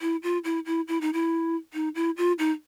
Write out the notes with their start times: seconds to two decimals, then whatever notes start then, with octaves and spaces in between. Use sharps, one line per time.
0.01 E4
0.23 F4
0.44 E4
0.66 E4
0.88 E4
1.01 D#4
1.13 E4
1.74 D#4
1.95 E4
2.17 F4
2.39 D#4